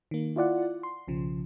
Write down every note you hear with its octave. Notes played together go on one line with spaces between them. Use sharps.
D#3 A#3
E4 F4 D5 F#5
C6
B1 C#3 F3